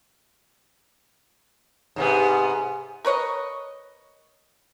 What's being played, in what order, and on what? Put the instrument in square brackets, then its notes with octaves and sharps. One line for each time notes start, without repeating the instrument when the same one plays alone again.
[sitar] G#2 C3 B3
[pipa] A#4 B4 C#5 D#5